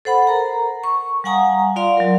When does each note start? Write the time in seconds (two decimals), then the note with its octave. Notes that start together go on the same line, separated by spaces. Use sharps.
0.05 A4 C5 F#5 B5
0.27 A#4 A#5
0.84 C#6
1.24 G3 F5 F#5 G#5 A#5 D#6
1.76 F4 D5 F5 C6
1.97 F#3 A#4